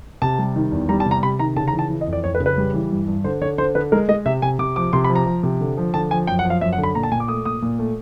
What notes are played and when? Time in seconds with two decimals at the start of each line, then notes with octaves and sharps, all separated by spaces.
0.22 C3 A5
0.39 G3
0.56 D#3
0.72 E2
0.89 G3 A#5
1.00 A5
1.06 C3
1.11 A#5
1.23 C3 B5
1.39 D#3 A#5
1.56 C#3 A5
1.68 A#5
1.73 E3
1.79 A5
1.90 E3
2.01 D#5
2.07 F2
2.13 D5
2.24 F2 C#5
2.35 B4
2.40 C#3
2.46 B4
2.57 G3
2.74 E3
2.91 G2
3.07 G2
3.24 D3 C5
3.41 D3 C#5
3.58 D3 C5
3.75 D3 B4
3.92 G#3 A#4
4.09 G#3 D#5
4.26 C3 E5
4.42 C3 G#5
4.59 C3 D6
4.76 F3 D6
4.93 C3 C6
5.04 B5
5.10 F3
5.15 A#5
5.26 F3
5.43 C3
5.61 D3
5.77 F3
5.94 D3 A5
6.11 F3 G#5
6.27 F#2 G5
6.39 F#5
6.45 F3
6.50 F5
6.61 F#2 E5
6.73 F#5
6.78 D3
6.83 B5
6.95 A#2 A#5
7.03 A5
7.11 A#2 G#5
7.20 D6
7.28 A3 D#6
7.45 A#2 D#6
7.62 A#2
7.79 A3